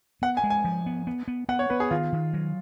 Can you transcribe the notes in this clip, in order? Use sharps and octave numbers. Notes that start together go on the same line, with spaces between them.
B3 F#5
G#5
G#3
G#5
F3
B3
B3
B3
B3 F#5
C#5
B3 B4
G#4
D#3 F4
D#3
F#3